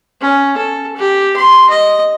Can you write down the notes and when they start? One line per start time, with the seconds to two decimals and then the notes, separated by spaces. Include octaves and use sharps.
0.22 C#4
0.57 A4
0.96 G4
1.36 C6
1.70 D#5